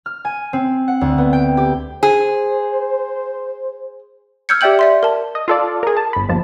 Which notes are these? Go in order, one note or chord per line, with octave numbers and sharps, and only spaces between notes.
F6
G#5
C4
F#5
D2
B3
G5
G4
G#4 C5
E6 F6 G6 G#6 C#7
G4 D5 E5 G5 G6 F#7
D5 E5 C6
A#4 A5
D#5
F4 A4 D5
G#4 A#4
A5
G1 B5
G1 D#2 F3 A5